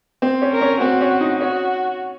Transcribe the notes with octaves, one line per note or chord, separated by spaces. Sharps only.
C4
C#4
A#4
C#4
C4 F#4
C#4
D#4
C#4 F#4